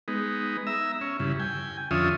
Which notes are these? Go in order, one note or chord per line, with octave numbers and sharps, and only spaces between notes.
G#3 B3 D#4
E5 A#5 E6
C#4
G2 C#3 E4
G5 G#5
F2 D3 C#4 F4 E5 D#6